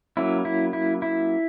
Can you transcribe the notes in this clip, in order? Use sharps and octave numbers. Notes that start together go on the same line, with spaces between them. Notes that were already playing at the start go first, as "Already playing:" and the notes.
F#3 A#3 C#4 E4
E4
E4
E4